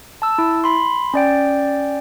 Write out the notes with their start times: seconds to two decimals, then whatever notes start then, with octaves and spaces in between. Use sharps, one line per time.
0.22 A5 E6
0.38 E4
0.64 B5 C6
1.14 C#4 D5 G5